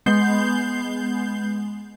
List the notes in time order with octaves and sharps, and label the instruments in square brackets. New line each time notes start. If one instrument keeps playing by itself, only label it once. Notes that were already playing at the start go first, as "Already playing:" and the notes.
[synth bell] G#3 B3 G6 C7 G7